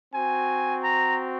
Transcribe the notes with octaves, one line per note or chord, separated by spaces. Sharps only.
C4 F#4 G#5
A#5